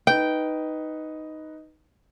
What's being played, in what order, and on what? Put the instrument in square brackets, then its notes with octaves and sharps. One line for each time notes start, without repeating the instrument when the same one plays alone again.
[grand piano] D#4 B4 [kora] G5